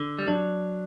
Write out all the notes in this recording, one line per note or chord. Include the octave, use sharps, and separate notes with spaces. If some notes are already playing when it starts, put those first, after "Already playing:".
Already playing: D3
G3
F#3 D4